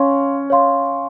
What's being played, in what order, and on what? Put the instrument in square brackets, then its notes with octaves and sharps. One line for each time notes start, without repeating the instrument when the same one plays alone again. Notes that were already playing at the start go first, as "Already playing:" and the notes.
Already playing: [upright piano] C#4 [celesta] C#5 F5 C6
[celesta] C#5 F5 C6